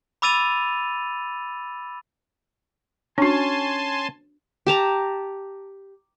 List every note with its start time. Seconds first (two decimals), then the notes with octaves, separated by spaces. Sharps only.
0.22 B5 D6 E6 A6 D#7 F7
3.18 C#4 D4 F#4 G#5 A5 C6
4.67 G4 A5 A#5